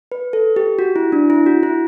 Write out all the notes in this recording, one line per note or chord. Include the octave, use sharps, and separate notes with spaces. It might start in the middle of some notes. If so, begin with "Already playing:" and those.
B4
A4
G4
F#4
E4
D4
E4
F#4
E4